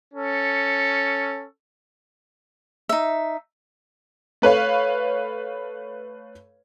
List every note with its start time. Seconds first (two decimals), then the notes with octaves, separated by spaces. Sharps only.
0.14 C#4 A4
2.89 D#4 E5
4.42 A3 B4 C#5 F5